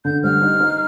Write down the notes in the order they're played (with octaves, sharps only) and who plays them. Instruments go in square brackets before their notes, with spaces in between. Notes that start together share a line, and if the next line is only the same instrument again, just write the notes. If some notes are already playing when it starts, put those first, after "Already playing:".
[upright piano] D3 [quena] G6
[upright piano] G3 [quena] F6
[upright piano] D#4
D#4